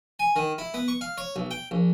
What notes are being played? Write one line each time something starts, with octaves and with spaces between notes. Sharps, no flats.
G#5
D#3
E4
B3
C#6
F5
C#5
B1
G5
A#1